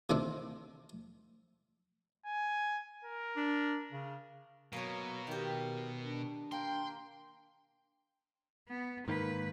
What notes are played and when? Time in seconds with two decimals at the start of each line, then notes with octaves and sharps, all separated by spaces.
0.10 C3 D#3 C4 D4
2.26 G#5
3.05 A#4
3.36 D4
3.92 C#3
4.73 B2 F#3 A#3 C#5
5.27 D#3 G4 A#4
6.04 D4
6.52 A#3 G5 C6
8.69 B3
9.08 G#2 D#3 A#3 B4